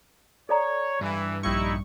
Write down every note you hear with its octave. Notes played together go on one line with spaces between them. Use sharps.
A4 C#5 D5 A#5
G2 E3
A#1 G3 D#4 E4 C#6